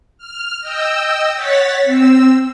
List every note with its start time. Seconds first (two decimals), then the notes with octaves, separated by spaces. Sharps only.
0.18 F6
0.61 D#5 G5 E6
1.35 C#5 F#5 A6 B6
1.83 C4 E6